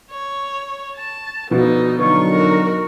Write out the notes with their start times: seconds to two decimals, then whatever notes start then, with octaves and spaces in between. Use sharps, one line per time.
0.12 C#5
0.96 A5
1.51 B2 D3 F3 D#4 F#4 B4
1.99 D3 F#3 D#4 F4 C#6
2.30 F#4 A#4